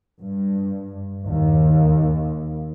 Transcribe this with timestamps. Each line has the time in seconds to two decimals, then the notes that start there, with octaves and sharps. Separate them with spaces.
0.21 G2
1.26 D#2